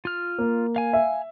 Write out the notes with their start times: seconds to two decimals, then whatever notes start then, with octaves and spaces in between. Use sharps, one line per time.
0.05 F4 F6
0.38 A#3
0.76 F5 G#5
0.93 E5